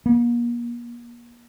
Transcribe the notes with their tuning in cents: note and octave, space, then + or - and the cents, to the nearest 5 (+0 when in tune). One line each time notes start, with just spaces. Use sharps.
A#3 +35